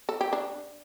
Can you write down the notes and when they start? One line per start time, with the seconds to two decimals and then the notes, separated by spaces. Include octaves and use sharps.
0.09 A4
0.21 G4
0.33 D4